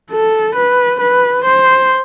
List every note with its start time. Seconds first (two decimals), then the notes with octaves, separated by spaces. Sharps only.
0.11 A4
0.55 B4
1.00 B4
1.45 C5